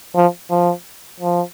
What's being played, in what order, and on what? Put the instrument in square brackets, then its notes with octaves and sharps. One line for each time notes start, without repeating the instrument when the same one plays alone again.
[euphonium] F3
F3
F3